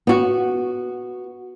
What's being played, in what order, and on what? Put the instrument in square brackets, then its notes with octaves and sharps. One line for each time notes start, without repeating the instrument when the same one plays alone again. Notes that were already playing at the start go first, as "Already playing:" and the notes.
[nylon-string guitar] B3 F#4